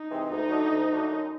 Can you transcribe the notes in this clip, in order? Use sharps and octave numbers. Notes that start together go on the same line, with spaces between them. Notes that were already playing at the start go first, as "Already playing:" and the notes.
Already playing: D#4
C3 E3 G#3 C4
D2 D#4
D3 F#3 A3 D4
D2
D3 F#3 A3 D4
F#2